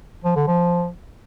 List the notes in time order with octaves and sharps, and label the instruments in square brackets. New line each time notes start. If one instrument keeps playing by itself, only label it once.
[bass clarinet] F3
D3
F3